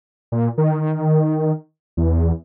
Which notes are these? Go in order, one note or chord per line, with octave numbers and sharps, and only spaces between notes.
A#2
D#3
E2